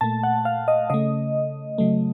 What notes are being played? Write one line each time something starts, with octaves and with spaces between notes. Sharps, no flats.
A#2 A3 A5
F#5
F5
D#5
C#3 A3 D#5
C#3 F#3 A3